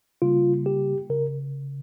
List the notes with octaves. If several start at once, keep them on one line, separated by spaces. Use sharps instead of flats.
C#3 G3 A#3 F4
G4
C#3 A#4